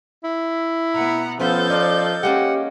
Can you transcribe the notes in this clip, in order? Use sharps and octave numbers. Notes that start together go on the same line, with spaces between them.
E4
B2 B3 F#5 A#5
F3 B3 C#4 F4 A4 E5 G6 A6
D#4 A#4 C5 D5
G#3 A#3 C#4 G4 F#5